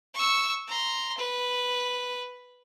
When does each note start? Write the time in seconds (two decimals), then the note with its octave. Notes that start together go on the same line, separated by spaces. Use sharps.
0.14 C#6 E6
0.68 A#5 C6
1.17 B4